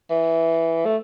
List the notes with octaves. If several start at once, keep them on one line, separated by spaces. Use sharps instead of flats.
E3
A3